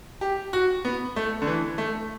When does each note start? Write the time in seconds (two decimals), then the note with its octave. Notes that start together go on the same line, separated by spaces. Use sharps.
0.21 G4
0.53 F#4
0.85 B3
1.16 A3
1.42 D3
1.47 E3
1.78 A3